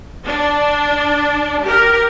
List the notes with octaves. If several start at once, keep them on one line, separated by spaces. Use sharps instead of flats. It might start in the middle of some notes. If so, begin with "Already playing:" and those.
D4
G4 A#4